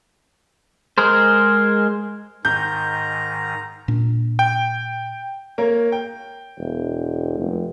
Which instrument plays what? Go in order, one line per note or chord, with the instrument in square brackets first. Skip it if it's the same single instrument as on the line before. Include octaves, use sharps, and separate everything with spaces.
[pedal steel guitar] G#3 G#4 A#4 C5
[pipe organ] G#2 D#3 [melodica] A#5 [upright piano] G6
[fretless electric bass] A#2 D4
[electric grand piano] G5
[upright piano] A#3 A#4 C#5
G5
[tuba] E1
F1